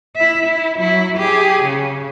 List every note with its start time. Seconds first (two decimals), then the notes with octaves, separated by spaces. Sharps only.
0.16 E4 E5
0.47 E4
0.79 F#3 E4
1.17 G4 G#4
1.64 C#3